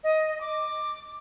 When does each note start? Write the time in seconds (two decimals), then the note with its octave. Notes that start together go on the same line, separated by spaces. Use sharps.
0.03 D#5
0.40 D6